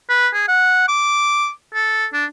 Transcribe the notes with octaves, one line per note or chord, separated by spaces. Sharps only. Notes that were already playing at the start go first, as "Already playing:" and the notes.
B4
G#4
F#5
D6
A4
D4